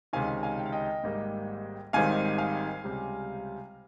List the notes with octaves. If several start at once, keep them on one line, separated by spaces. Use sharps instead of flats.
C#2 C3 D#3 F5 G#5
F5 G#5
G5
F5
D#5 G5
G#1 G#2 G3 A#3
G#1 G#2 D#3 G3 C4 F5 G#5
F5 G#5
C#2 C3 G3